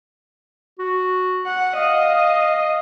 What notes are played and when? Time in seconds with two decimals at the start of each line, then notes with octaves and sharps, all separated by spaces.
0.79 F#4
1.46 F#5
1.77 D#5 F5